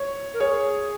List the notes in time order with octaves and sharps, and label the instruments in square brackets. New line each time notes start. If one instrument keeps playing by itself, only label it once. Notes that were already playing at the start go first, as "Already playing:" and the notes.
Already playing: [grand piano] C#5
[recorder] A#4
[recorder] G#4 [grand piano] C#5